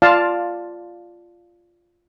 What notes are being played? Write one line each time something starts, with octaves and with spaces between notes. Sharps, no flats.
F4 D5 F5 A5